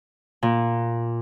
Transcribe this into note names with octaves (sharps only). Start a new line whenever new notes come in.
A#2